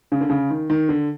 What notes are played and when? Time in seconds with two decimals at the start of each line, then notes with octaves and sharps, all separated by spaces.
0.12 C#3
0.21 D3
0.30 C#3
0.50 D#3
0.70 D#3
0.89 D3